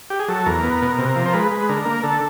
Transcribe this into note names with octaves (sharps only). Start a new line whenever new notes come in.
G4
G#4
F#3 A4
E2 A#4
B3
B2
C3
F3
C5
G#3 B4
G#3
D3 A#4
A#3
D3 A4